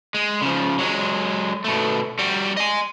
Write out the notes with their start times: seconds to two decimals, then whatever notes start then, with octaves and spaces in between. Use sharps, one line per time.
0.14 G#3
0.41 C#3 F3
0.79 F#3 G#3
1.64 B2 A3
2.19 G3 F#4
2.57 D#5 G#5